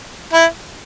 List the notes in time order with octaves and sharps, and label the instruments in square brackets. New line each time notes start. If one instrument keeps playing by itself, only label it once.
[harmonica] E4